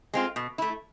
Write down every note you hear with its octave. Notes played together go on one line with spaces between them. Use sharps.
G#3 C4 F4
B2
A3 E4